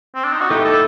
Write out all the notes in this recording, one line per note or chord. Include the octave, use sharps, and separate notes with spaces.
C4
D4
D#4
F#4
A2 A3 D#4 G4
A4